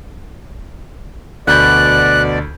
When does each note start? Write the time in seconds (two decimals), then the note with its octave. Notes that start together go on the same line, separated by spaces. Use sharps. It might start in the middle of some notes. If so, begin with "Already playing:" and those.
1.47 D2 B2 D5 B5 F#6 G6